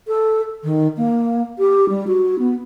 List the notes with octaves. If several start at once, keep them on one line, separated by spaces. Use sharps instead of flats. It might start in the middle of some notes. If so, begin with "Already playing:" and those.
A4
D#3
A#3
G4
G3
F#4
B3